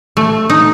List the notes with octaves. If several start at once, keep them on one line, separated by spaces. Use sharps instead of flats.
A3
D#4